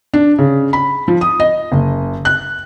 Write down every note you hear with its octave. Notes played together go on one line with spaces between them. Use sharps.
D4
C#3
B5
F3
D#6
D#5
F#1
F#6